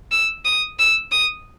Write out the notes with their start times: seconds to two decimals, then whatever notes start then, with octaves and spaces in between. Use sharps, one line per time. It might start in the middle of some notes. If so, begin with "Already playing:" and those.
0.12 E6
0.45 D#6
0.79 E6
1.12 D#6